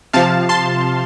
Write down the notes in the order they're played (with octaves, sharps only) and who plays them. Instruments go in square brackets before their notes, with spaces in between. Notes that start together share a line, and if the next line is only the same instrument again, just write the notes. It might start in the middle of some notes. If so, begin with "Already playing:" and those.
[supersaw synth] C3 F3 F5 A5
A5 C6